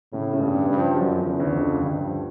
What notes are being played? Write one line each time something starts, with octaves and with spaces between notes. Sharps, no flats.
A2 C#3
C#3
G2
C#3
G2
F3
F#2 F3
C#3
E2
D2
F2
C#3
D2 G2
F3